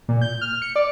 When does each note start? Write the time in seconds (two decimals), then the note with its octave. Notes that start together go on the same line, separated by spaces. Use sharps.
0.08 A#2
0.21 G6
0.41 F6
0.62 C#7
0.76 D5